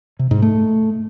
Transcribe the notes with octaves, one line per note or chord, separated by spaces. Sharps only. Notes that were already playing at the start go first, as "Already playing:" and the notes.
C3
G#2
A3